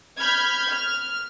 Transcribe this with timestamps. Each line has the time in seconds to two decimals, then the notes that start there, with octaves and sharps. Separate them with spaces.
0.21 B5 F6 G6 G#6
0.72 F6